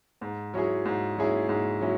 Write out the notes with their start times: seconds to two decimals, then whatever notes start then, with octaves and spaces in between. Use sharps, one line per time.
0.21 G#2
0.54 F#3 C#4 E4 G#4
0.85 G#2
1.17 F#3 C#4 E4 G#4
1.49 G#2
1.81 F#3 C#4 E4